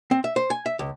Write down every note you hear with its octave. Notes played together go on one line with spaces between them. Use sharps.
C4
E5
C5
G#5
E5
C#2